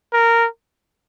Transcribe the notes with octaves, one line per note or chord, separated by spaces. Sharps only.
A#4